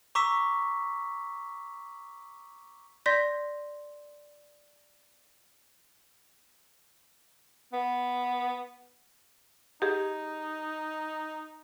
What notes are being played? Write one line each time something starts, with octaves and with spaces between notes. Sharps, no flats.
A#5 C#6 D6 E6 B6 E7
D5 C6 G6 A#6 B6
B3
D#4 G4 G#4